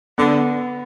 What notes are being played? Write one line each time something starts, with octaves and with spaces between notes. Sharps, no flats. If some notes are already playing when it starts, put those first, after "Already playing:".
D3 B3